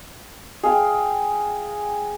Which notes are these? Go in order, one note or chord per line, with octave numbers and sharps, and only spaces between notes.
G#4 F5 G5